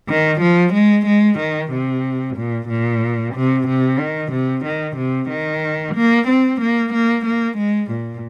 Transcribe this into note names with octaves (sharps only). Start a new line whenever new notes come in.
D#3
F3
G#3
G#3
D#3
C3
A#2
A#2
C3
C3
D#3
C3
D#3
C3
D#3
A#3
C4
A#3
A#3
A#3
G#3
A#2